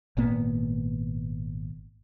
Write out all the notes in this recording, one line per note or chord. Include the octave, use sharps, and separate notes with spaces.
G#1 A#2 A#3 B3